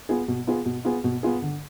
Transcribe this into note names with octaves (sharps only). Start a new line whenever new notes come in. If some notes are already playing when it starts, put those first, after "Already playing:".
B3 F4 G#4
B2
B3 F4 G#4
B2
B3 F4 G#4
B2
B3 F4 G#4
D3